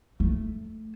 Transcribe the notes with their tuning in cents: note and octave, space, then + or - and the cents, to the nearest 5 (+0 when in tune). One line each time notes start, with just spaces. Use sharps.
A3 +0